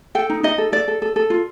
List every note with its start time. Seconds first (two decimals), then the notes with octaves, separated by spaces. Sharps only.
0.15 A4 G5
0.30 D#4
0.43 D#4 D#5
0.58 A4
0.72 A4 D5
0.88 A4
1.02 A4
1.16 A4
1.30 F4